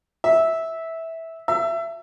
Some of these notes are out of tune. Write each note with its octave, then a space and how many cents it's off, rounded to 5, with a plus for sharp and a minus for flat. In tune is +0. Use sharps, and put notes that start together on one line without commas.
E5 -15
E5 +20